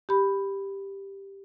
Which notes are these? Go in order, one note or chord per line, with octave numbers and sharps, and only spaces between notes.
G4 B5